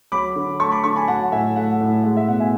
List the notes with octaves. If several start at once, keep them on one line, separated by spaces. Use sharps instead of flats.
F#3 B5 D6
D3
A3 A5 C#6
B5 D6
D3 A5 C#6
G#5 B5
F#3 F#5 A5
A2 E5 G#5
A3 F#5
A2
G#3 F#5
E5
B2 F#5
E5 G#5